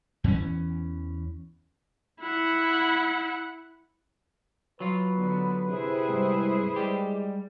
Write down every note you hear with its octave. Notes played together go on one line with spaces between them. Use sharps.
E2 E3 A#3 C#4
E4 F#5
F#3 F4 B4
D3 B3
C3 E4 G#4 C5
C2 G#2
G3 G#3 G4